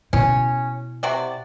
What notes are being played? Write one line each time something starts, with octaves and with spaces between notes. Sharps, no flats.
B2 C#4 E4
C3 F#4 D5